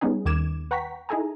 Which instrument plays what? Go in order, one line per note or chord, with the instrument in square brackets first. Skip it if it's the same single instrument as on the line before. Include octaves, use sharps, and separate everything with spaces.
[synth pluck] G3 B3 C#4 D#4 G#4
D#2 D#3 D6 G#6 E7
B4 F#5 G5 A#5 C#6 B6
D#4 E4 G#4 A4 G#5 A#5